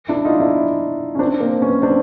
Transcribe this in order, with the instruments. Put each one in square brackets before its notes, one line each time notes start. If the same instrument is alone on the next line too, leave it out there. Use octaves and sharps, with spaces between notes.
[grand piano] D4 E4
D#4 F4
D4 E4
C#4
C4 D4
A#3 C4
B3 C#4
C4 D4